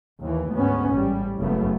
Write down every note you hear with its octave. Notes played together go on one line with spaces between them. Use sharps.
D#2 E3
D2 G#2 B3 C#4
A1 G3
F#1 F#2 C#3 A3 B3